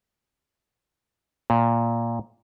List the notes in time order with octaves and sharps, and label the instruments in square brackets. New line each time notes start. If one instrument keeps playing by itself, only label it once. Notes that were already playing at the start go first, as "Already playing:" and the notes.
[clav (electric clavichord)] A#2